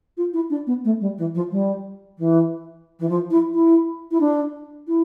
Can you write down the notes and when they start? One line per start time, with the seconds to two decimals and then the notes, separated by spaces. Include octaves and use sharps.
0.17 F4
0.33 E4
0.50 D4
0.67 B3
0.85 A3
1.01 G3
1.18 E3
1.35 F3
1.51 G3
2.18 E3
3.00 E3
3.09 F3
3.30 E4
3.54 E4
4.11 E4
4.20 D4
4.88 E4